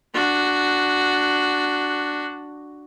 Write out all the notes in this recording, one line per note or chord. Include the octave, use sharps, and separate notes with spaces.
D4 F#4